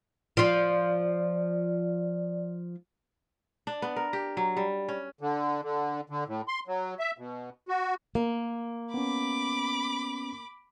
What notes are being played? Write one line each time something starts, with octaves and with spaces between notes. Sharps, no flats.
F3 F4 D5
D4
B3
A#4
G4
F#3
G3
C#4
D3
D3
D3
A2
C6
F#3
E5
B2
F#4
A#3
B3 C#4 B5 D6